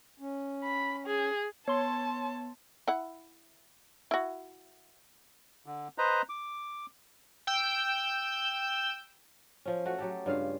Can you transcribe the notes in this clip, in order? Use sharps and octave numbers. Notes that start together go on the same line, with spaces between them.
C#4
B5
G#4
B3 C#5 A5 C6
E4 F#5
E4 F#4
D3
B4 C5 D#5 A#5
D6
G5 E6 G6
F3 C#4
A3 F#4
F#3 G4 A4
G2 C#3 F4 F5